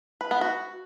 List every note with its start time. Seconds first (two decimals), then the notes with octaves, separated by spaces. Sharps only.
0.21 B4
0.31 B3
0.41 F#4